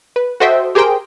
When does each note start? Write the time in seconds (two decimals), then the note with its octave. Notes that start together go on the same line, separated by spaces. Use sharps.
0.16 B4
0.40 F#4 A4 C5 D#5 E5 G5
0.75 G4 G#4 A#4 C5 G5